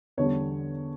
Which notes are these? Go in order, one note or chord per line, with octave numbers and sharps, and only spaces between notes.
E2 D3 G3 C#5